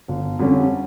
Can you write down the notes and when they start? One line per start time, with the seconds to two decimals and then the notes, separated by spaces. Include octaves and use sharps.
0.08 G1
0.39 F2 D3 G3 C#4